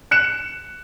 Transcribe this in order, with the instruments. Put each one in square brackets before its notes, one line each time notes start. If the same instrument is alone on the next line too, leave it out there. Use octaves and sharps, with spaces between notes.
[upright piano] F#6 C#7 E7